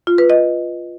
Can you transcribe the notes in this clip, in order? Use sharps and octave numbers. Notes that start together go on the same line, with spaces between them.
F4
B4
D#5